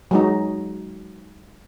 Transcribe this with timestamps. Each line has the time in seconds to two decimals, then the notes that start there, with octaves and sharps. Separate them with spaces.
0.11 F#3 G#3 D#4